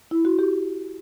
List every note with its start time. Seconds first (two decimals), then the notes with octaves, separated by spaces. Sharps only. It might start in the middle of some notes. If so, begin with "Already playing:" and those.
0.11 E4
0.25 F#4
0.39 G4